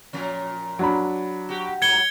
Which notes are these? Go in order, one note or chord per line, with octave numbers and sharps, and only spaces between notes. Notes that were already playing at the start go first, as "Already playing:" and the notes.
A#2 F3 C#4
F#3 D4 B5
F#4 G4
G#2 F#3 G#6 C#7 G7